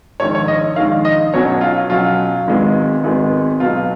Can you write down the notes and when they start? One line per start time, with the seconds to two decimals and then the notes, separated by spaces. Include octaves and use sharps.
0.20 A#1 G#2 D#3 C#5
0.35 C#5
0.48 D#5
0.76 A#1 G#2 D#3 F5
1.05 D#5
1.34 B1 B2 F#3 C#4 C#5
1.61 F4
1.89 B1 B2 F#3 C#4 F4
2.47 G#1 G#2 D#3 G#3 B3
3.04 G#1 G#2 D#3 G#3 B3
3.60 B1 B2 F#3 B3 F4